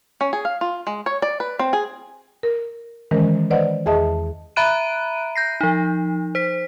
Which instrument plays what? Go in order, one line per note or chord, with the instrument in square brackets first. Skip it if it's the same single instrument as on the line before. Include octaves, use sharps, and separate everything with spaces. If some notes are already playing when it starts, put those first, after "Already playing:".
[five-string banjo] C#4
G#4
F5
F4
G#3
C#5
D5
B4
C4
G#4
[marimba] A#4
D#3 E3 G#3 C#4 A#4 C5
B4 C5 D5 D#5 F#5
E2 G#4 D#5 E5 A5 D#6
[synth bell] E5 A#5 B5 F#6 D7 D#7
G6 A#6 C7
F3 D#4
C5 B6